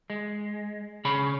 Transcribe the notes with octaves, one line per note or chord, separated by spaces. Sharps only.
G#3
C#3 C#4 G#4 C#5 B5